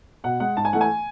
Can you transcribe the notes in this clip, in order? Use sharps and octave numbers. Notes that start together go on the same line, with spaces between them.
B2 F#5
G#3 F#5
G#2 A5
G#5
E3 A3 F#5
G#5